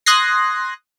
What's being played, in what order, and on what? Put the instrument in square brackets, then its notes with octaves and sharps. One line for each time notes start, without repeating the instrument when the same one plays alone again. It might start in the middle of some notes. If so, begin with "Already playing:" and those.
[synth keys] C6 D#6 F#6 G#6 A#6 C7